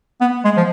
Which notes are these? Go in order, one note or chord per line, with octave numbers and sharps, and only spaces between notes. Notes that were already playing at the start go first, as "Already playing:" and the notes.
B3
G#3
F3